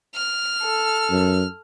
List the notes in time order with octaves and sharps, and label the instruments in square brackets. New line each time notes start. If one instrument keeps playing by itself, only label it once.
[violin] F6
[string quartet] A4
[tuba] F#2